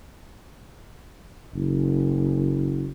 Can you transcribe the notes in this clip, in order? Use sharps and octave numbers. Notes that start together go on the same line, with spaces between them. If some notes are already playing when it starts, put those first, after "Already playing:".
F#1